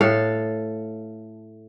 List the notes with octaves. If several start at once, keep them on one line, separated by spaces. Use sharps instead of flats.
A2 A4 F5